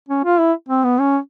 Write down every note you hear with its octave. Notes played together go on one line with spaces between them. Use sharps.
C#4
F4
E4
C4
B3
C#4